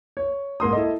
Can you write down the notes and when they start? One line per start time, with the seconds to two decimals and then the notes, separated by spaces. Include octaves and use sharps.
0.17 C#5
0.60 G#2 A#3 C6 D#6
0.73 E4 A4 D#5